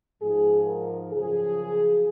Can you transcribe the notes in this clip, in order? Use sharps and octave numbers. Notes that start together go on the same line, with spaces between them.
G#2 F3 G#4
A#4
F#2 C#3 F3 G#4